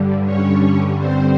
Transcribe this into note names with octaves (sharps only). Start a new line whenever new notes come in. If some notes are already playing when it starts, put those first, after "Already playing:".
Already playing: G2 D3 G3
C#4 C#5
C4 C5